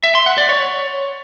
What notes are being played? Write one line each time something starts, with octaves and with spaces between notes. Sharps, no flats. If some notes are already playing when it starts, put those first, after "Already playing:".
E5
C6
F#5
D5
C#5